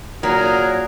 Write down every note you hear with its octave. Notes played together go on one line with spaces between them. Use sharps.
A#2 F#3 G#4 A#4